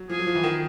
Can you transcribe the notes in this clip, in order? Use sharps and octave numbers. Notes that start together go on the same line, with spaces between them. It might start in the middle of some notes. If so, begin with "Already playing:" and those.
Already playing: F#3
F3 G#4
F#3
F3
E3
D#3